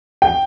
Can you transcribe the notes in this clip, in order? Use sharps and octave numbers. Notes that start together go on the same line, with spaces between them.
G5